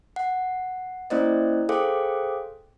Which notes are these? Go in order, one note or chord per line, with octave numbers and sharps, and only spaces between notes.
F#5
A#3 C#4 E4 C5 D5 D#5
G#4 A4 C5 F5 G5 D6